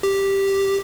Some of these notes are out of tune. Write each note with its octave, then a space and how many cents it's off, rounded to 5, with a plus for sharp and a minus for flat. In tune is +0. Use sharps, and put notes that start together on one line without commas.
G4 +0